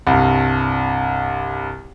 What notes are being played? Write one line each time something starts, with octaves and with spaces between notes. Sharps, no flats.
C2 G2